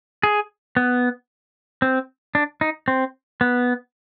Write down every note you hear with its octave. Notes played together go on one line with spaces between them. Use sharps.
G#4
B3
C4
D4
D#4
C4
B3